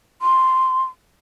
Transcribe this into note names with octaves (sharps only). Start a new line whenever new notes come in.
C6